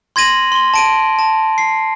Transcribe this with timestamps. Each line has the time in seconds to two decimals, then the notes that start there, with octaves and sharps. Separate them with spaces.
0.16 C6 G#6 A#6 D#7 F#7
0.52 C6 G7
0.74 A5 D7 D#7
1.19 A5
1.58 C7